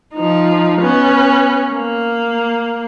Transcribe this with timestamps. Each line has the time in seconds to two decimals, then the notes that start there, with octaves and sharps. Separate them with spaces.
0.15 F3 D#4
0.81 B3 C#4
1.70 A#3